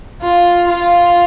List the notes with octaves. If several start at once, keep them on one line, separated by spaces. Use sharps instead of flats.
F4
F4